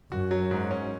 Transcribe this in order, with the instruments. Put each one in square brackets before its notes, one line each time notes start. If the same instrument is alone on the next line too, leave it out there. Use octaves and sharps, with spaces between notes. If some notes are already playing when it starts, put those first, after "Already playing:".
[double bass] F#2 [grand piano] F#4
[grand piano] F#3
G#2
C#4